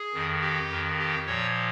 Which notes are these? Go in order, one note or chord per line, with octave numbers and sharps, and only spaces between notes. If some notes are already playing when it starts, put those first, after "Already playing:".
Already playing: G#4
F2 D#3
G4
F2 D#3
G4
A#2 F3 C#5